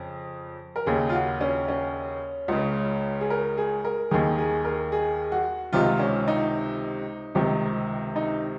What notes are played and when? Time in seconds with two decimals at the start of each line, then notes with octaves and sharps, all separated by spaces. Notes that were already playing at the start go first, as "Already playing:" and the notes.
Already playing: F2 C#3
0.76 A#4
0.86 D#2 C#3 G#4
1.09 F4
1.13 F#4
1.41 C#4
1.68 C#4
2.48 C#2 C#3
3.21 G#4
3.30 A#4
3.58 G#4
3.85 A#4
4.11 D#2 D#3 G#4
4.38 G#4
4.65 A#4
4.92 G#4
5.32 F#4
5.73 C#2 C3 D#3 F4
5.99 C#4
6.28 D#4
7.35 C#2 C3 D#3
8.16 D#4